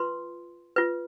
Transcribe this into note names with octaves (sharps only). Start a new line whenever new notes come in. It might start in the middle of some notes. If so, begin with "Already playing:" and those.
Already playing: F4 B4 C6
F4 B4